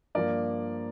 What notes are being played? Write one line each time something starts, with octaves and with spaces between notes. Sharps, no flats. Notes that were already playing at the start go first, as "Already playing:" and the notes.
G2 F3 A#3 A#4 D5